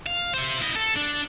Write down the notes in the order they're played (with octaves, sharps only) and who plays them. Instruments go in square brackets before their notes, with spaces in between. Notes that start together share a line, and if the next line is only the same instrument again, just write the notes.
[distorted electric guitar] F5
C5 E5
E4 D#5
A4
D4